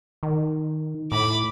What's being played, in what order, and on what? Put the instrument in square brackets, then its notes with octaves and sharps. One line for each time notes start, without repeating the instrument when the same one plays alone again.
[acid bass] D#3
[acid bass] A2 [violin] B5 D6